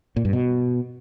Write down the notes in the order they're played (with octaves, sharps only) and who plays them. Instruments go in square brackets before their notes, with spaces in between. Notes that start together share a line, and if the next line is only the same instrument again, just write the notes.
[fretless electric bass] A#2
G2
B2